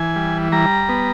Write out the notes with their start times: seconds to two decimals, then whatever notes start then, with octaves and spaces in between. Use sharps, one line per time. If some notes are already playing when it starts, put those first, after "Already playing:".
Already playing: E3 G#5
0.16 G3
0.52 G3 A#5
0.89 B3